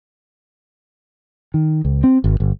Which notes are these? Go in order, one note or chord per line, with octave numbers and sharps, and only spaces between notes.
D#3
C#2
C4
G#1
G1